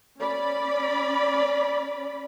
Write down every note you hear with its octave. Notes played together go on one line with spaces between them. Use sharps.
C#4 D5 B5